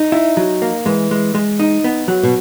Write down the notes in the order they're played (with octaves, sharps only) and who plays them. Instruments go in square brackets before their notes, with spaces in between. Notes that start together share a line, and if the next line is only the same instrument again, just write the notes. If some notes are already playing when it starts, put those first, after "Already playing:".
Already playing: [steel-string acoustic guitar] D#4
[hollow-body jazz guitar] E4
F#3
A#3
[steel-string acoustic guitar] E3 [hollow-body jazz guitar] G#3
[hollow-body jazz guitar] G#3
G#3
D#4
B3
F#3
[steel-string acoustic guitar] B2